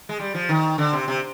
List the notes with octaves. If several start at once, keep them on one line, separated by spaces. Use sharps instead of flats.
G#3
G3
F3
D#3
D3
C3
C3